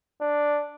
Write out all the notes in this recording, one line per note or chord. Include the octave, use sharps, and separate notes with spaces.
D4